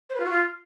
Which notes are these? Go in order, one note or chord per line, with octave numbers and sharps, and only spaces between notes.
C5
B4
F4
F#4
F4